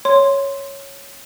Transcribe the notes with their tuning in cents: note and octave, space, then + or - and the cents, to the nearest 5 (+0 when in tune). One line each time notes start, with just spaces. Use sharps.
C#5 +0 C6 +0